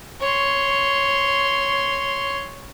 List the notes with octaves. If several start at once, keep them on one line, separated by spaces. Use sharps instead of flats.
C#5 C6